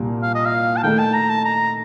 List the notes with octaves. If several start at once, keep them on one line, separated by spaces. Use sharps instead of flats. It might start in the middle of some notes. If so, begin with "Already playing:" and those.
Already playing: C2 A#2 G3 A#3
F5
D#5
F5
A5
D#3 A3 D#4 A4 G5
A5
A#5
A5
A#5